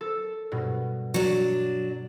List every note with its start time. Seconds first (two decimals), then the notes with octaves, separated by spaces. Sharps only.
0.01 A4
0.52 G2 B2
1.14 F#3 D4